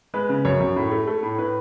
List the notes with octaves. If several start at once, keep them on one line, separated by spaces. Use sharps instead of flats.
G#3 B4
C#3
F#2 C#5
F#2
A2
A3
A3
A2
A2 B4